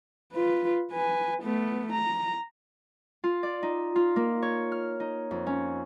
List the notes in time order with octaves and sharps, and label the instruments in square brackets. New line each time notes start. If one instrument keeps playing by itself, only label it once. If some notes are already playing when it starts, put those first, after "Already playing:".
[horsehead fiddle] F4 B4
B4 G#5
A3 B3
A#5
[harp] F4
D5
D#4
F4
A#3
C#5
F6
D#4
F2
C#4